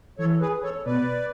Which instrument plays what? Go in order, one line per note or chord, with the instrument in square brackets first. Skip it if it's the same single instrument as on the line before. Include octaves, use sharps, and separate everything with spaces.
[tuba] E3 [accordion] A4 C#5
[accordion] G#4 B4
A4 C#5
[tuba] B2 [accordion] B4 D5